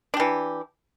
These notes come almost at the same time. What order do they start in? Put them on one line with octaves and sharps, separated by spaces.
D4 G4 E3